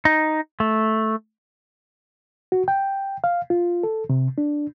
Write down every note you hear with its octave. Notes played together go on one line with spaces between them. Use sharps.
D#4
A3
F#4
G5
F5
F4
A4
C3
D4